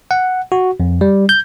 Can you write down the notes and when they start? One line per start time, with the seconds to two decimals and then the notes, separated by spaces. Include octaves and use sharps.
0.11 F#5
0.52 F#4
0.80 F2
1.01 G3
1.29 G6